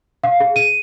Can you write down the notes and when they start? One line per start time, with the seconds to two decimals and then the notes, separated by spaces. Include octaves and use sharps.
0.24 F5
0.40 G#4
0.56 D#7